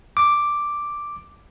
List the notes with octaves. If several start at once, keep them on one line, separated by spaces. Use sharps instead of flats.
D6